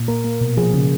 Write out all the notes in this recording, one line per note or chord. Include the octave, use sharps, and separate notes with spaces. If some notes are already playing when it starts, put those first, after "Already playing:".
Already playing: A#2
A#3 A#4
A#3
B2
F3 G#4
C#3